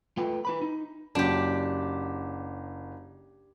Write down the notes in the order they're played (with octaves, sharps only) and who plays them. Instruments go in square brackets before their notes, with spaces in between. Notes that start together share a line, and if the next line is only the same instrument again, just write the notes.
[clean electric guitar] A3 F4 B4 G5
E4 B4 B5
D#4
[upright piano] F#1 F#3 [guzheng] D4 G4